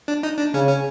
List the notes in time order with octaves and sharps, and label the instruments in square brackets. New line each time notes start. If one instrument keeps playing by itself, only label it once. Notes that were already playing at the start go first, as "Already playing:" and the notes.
[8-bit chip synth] D4
D#4
D4
[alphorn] C#3 [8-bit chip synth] C#4
[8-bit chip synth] C#4